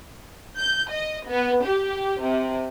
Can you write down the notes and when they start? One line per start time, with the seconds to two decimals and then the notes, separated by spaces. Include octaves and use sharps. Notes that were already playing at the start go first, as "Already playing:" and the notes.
0.58 G6
0.90 D#5
1.27 B3
1.65 G4
2.23 C3